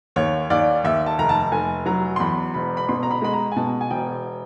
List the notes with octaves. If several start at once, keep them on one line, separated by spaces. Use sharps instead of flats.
D#2 C#5
D#2 D5
D#2 E5
A5
F1 A#5
A5
F1 G#5
F#3 A#5
C6
E2 B5
E1 B5
B5
B2 C6
A#5
B5
G#3 B5
A#5
G#5
B2 A5
G#5
E1 G5